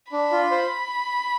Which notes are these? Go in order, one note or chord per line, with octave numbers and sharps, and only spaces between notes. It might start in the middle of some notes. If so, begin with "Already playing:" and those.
D4 B5
F4
C5